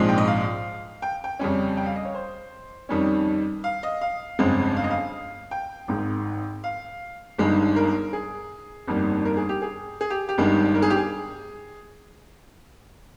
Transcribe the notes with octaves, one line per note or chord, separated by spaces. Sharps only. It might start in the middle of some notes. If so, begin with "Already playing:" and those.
Already playing: A#1 G#2 F3 G#3 C4
G5
D#5
F5
G5
G5
F2 C#3 G3 C#4
G5
F5
D#5
C#5
C5
F2 D#3 G3 C#4
F5
D#5
F5
G1 F2 C#3 G#3 C4
F5
D#5
F5
G5
G#1 G#2 D#3
F5
G1 G2 D#3 G#3
A#4
G#4
G1 F2 D#3 G3 A#3
A#4
G#4
G4
G#4
G#4
G4
G4
G1 G2 D#3 G#3
A#4
G#4
G4
G#4